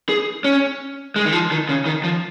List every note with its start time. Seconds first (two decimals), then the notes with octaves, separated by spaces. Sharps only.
0.09 G#4
0.44 C#4
1.16 G#3
1.25 D#3
1.32 F3
1.51 D#3
1.69 C#3
1.86 D#3
2.04 F3